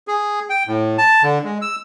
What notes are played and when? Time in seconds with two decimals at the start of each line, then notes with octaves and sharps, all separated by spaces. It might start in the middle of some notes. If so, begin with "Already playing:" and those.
0.08 G#4
0.50 G5
0.67 A2
0.98 A5
1.23 D3
1.44 G#3
1.62 E6